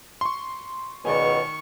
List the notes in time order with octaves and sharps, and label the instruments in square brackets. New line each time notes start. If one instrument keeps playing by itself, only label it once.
[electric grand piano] C6 C#6
[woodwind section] C#2 B2 [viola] D#3 C#6 [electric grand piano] D5 G#5